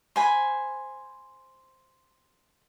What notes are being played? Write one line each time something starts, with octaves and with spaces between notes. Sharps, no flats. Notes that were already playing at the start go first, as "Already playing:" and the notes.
C5 G#5 B5